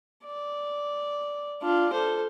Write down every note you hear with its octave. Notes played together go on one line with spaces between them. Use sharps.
D5
D4 F4
A4 C5